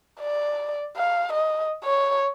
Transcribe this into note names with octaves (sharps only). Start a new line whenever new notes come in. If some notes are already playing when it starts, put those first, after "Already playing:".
D5
F5
D#5
C#5